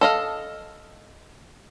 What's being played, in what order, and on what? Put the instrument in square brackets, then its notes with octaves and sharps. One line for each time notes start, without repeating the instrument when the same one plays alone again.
[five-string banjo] A4 D#5 F5